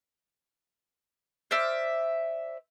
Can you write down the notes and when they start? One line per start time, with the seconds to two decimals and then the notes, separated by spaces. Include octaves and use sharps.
1.51 C5 D5 E5 F6